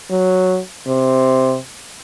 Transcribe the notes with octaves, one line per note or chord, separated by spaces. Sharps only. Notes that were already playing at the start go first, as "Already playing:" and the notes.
F#3
C3